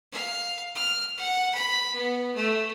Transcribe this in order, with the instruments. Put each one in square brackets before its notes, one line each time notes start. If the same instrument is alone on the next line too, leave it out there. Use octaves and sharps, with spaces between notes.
[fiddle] F5
F6
F#5
B5
B3
A3